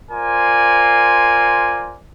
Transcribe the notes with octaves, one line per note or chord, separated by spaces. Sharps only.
F4 A#4 C5 D5 G#5